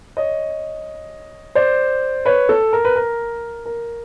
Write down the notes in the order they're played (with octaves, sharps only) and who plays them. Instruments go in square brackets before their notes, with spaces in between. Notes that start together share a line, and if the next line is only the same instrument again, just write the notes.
[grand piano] C#5 D#5
C5 D5
B4 C#5
A4
A#4
B4
A#4
A#4